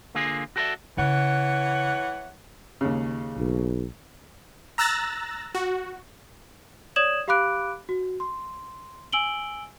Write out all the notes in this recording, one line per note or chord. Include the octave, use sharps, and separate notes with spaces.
D3 A#3 F4 G#4
F#4 G4 A4 B4 D5 E5
C#3 E3 C#5 F#5
D#2 C#3
B1
A#5 E6 F#6 A6 A#6
F#4
C#5 D5 D#6 G#6 E7 F#7
G4 F5 B5 D6 F#6 D7
F#4
C6
G#5 E6 D7 F#7 G7